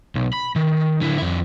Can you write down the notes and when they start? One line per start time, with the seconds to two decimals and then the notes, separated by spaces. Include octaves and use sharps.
0.15 B1
0.33 B5
0.56 D#3
1.02 D3 E4
1.18 F2 E4